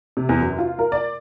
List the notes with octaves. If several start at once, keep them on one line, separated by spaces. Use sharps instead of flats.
C3
E2
F#2
F4
A#4
D5